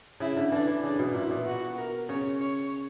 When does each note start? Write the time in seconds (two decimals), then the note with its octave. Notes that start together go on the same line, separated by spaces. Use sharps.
0.20 C#3 E4
0.37 D3
0.52 E3 D4
0.67 E3
0.83 C#3 D4
0.99 B2
1.14 A#2 E4
1.31 B2
1.45 F#4
1.77 A#4
2.09 C#3 C#5
2.40 C#5